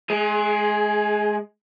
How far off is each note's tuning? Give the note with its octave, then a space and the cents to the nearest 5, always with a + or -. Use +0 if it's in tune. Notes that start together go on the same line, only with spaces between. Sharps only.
G#3 +30 G#4 +0